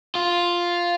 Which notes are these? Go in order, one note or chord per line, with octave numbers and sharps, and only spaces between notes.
F4